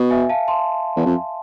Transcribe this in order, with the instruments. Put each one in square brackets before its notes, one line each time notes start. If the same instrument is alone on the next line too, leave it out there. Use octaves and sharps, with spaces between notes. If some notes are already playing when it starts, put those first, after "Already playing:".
Already playing: [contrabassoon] B2
[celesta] E5 G#5
F5 A5
A5 C6
[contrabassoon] E2
F2